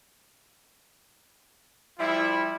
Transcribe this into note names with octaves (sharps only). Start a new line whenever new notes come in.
F3 G3 E4